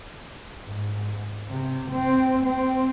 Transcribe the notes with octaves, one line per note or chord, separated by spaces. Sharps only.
G#2
C3
C4
C4